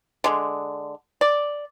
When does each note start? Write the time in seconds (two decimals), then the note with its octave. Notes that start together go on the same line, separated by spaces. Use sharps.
0.24 D3 G#3
1.21 D5